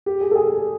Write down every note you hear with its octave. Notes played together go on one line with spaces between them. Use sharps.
G4
G#4
A4
G#4